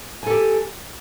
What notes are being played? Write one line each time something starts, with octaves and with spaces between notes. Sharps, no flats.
G4 A4 G#5